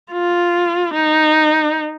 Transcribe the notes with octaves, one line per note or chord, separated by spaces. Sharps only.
F4
D#4